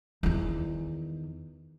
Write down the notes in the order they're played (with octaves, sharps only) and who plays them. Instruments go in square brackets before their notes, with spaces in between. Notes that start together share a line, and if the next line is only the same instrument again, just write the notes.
[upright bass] E2 D#3